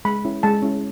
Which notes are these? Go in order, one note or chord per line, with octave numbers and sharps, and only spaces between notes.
G#3 B5
C#4 E4
G#3 A5
C#4 E4